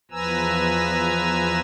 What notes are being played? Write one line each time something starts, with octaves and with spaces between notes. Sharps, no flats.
E2 F3 B4 G#5 A#5 E6